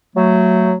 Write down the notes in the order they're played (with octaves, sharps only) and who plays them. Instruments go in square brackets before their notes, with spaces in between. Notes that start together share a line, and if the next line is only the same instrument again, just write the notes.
[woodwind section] F#3 A3